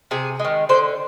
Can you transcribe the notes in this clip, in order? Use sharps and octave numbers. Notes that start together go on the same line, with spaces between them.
C3 G#4
G#3
D#3
D3 C5